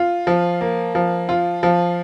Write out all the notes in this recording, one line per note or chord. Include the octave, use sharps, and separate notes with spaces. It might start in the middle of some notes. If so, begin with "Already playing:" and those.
Already playing: F4
F3
A#3
F3
F4
F3